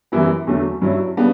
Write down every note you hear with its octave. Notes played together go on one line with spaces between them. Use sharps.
F#2 E3 G3 B3 E4
E2 D3 F#3 A3
G2 F#3 C#4 E4
C#3 G3 B3 D4